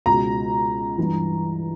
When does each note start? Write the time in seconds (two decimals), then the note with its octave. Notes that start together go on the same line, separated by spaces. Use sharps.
0.06 C#2 B2 A#5
0.98 G2 E3